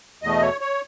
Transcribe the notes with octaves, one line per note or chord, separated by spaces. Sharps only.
E2 B2 A3 D#5
C#5
C#5